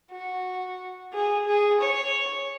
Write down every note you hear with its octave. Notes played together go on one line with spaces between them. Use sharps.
F#4
G#4
G#4
C#5